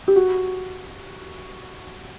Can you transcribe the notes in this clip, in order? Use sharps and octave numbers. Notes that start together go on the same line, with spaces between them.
G4
F#4